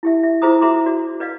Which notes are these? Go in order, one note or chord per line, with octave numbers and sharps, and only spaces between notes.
E4 G4 E5
E5
E4 F4 G#4 C5 A#5 D#6
F#4 G#4 E5 A#5 C6 D6
F#4 D5
B4 D5 D#5 F5